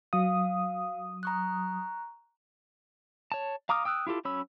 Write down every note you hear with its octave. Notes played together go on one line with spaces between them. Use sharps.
F#3 F5 D#6
A#5 C#6 F#6
C#5 A5
F5 A#5 D6 D#6 F6
G5 D#6 E6 F#6
E4 F4 G4 A4
F#3 C#4 C#5 B5 E6